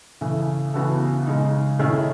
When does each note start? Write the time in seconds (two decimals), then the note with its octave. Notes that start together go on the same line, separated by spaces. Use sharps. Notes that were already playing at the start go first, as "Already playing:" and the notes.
0.21 C#3 E3 A3
0.74 C#3 E3 B3 F#4 A4
1.27 C#3 G#3 D#4
1.79 D#3 A3 C#4 E4 G#4